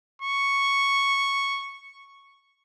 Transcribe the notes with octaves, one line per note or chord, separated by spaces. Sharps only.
C#6